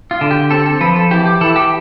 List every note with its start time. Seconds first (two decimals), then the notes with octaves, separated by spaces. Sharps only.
0.11 F4
0.21 D3
0.31 G4
0.51 C4 A4
0.66 A4
0.81 F3 B4
0.96 A4
1.11 E3 G4
1.25 G4
1.41 E3 A4
1.56 G4